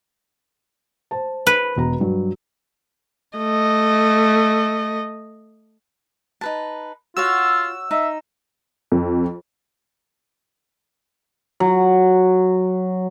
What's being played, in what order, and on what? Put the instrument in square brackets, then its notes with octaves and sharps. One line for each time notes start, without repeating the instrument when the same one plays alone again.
[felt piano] C5 A5
[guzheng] B4
[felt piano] E1 B2 A#5
G2 F#3
[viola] A3 D#5
[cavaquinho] D#4 B4 A5
[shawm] F4 [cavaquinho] F#4 C#5 F#5 [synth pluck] E6
[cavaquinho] D#4 [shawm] E5
[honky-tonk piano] F2
[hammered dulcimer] F#3